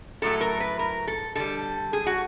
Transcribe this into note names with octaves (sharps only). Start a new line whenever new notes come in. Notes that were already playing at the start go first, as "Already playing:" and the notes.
A2 F#3 A3 A4
A#4
B4
A#4
A4
D3 G3 A4
G#4
F#4